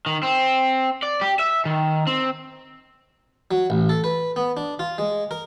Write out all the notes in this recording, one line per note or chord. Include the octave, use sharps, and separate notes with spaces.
D#3
C4
D5
G4
E5
D#3
C4
F#3
A1
A4
B4
B3
D4
F4
G#3
A#4